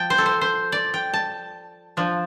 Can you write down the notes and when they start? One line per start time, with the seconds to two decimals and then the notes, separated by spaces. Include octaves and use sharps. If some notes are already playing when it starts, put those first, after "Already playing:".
Already playing: F3 G5 A5
0.10 C5
0.18 A4
0.26 C5
0.41 C5
0.72 D5
0.94 G5
1.14 A5
1.97 F3 D4